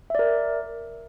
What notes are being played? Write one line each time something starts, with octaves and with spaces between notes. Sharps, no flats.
A#4 D5 E5